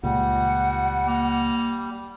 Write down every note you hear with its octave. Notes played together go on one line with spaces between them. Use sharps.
C#2 A#2 G3 F#5
A#3